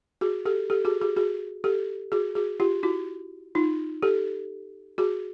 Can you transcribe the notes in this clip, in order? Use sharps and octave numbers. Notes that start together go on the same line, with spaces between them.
F#4 G#4
G4 A4
G4 A4
F#4 G#4
F#4 G#4
F#4 G#4
G4 A4
F#4 G#4
F#4 G#4
F4 G4
E4 F#4
D#4 F4
G4 A4
F#4 G#4